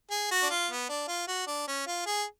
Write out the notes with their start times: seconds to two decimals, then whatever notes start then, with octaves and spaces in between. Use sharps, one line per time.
0.11 G#4
0.31 F#4
0.43 D4
0.50 F4
0.70 B3
0.89 D4
1.08 F4
1.27 F#4
1.47 D4
1.67 C#4
1.87 F4
2.06 G#4